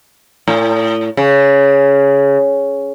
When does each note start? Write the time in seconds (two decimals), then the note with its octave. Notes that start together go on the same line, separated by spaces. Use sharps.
0.48 A2
1.17 C#3